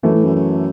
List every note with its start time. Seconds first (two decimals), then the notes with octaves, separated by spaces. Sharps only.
0.03 F#2 E3 A3
0.15 A2
0.25 F#2
0.35 F#2